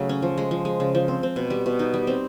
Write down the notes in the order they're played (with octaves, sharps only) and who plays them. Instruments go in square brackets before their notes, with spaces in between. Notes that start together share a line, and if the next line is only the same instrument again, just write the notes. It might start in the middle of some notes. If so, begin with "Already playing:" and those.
Already playing: [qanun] C#3 F#3 A3
C#4
F3
G#3
F3
G#3
C#3
F3
C4
C4
B2
G3
B2
D#4
G3
C4